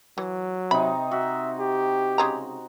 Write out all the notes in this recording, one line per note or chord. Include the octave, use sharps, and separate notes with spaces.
E3 F#3
C3 D#4 B5
F#4 E5
G4
C#3 G#3 A#5